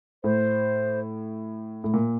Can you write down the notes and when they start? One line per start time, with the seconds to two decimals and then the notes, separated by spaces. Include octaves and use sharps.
0.24 A2 C5
1.84 A2
1.94 A#2